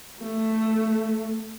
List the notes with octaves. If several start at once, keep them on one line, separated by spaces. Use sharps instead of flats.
A3